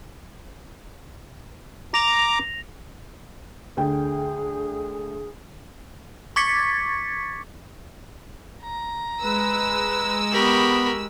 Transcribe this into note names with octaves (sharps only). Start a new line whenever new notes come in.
A#5 D6 A#6 F7
D2 D3 G#4 G5
C#6 D6 G#6 A6 B6 C#7
A#5
G#3 B4 E6
B3 G4 A#4 B5 C#6